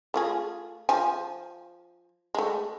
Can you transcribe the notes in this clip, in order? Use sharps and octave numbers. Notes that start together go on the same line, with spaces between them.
A3 F4 G#4
F3 G#5
G#3 A3